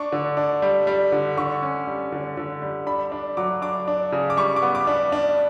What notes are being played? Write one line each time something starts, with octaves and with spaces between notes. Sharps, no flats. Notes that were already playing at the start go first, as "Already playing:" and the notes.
Already playing: D4 C#6
D3
D4
G3
G3
D3
D3 C#6
C#4
G3
D3
D3
G3
D4 B5
D4
F#3 D6
D4 D6
D4
C#3
D6
G3 C#6
D6
B3
D6
D4
D4